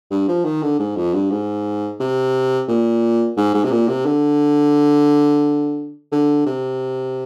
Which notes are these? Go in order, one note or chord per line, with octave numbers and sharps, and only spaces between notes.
G2
F3
D#3
D3
G#2
F2
G2
G#2
C3
A#2
G#2
G#2
C3
A#2
C3
D3
D3
C3